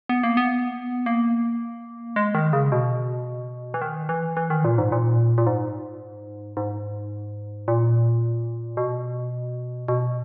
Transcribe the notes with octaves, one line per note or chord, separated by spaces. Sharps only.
B3
A#3
B3
A#3
G#3
D#3
C#3
B2
E3
D#3
E3
E3
D#3
A#2
G#2
A#2
A#2
G#2
G#2
A#2
B2
B2